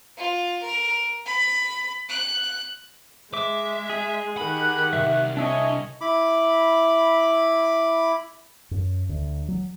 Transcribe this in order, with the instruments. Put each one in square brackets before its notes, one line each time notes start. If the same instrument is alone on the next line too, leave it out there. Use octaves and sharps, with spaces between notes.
[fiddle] F4
A#4
B5
F#6
[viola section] G#3 [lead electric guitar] E5 [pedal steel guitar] D6
[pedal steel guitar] G#4
[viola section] D#3 G4 F#5 [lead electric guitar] B5
[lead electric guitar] C2 F#2 [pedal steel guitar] E5
[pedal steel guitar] D4 E5 G#5 [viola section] C#5 D#5
[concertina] E4 B5 D6
[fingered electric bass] F#2
D2
F#3